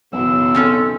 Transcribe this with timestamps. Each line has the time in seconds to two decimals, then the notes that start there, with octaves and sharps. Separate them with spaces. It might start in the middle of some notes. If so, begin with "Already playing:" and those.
0.13 B1 F#2 C#3 E3 E6
0.54 C4 C#4 A4